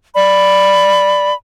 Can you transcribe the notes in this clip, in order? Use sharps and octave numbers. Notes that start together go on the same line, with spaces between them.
D5 B5